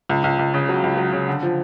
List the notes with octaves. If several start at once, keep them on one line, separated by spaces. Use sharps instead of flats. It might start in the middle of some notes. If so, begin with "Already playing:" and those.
C#2
C#2
C#2
C#3
F#3
C#2
F#3
C#3
D3
F3